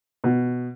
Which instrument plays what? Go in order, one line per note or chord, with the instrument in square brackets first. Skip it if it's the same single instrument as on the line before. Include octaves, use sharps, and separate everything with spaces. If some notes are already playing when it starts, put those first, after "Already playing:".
[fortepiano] B2